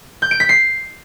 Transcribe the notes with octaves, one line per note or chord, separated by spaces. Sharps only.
G6
D7
B6
C7